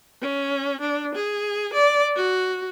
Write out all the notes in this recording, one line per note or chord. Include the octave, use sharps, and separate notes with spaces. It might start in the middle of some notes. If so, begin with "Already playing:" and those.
C#4
D4
G#4
D5
F#4